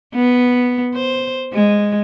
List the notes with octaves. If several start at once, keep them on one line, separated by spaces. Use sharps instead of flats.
B3
C5
G#3